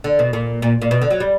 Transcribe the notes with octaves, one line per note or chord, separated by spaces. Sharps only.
D3
B2
A#2
A#2
A#2
B2
D3
F#3
G3